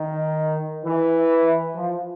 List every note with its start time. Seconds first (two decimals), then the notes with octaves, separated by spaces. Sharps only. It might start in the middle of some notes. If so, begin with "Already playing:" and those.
Already playing: D#3
0.84 E3
1.75 F3